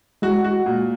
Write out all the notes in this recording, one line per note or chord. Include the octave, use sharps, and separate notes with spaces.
G#3 F#4
F#4
A#2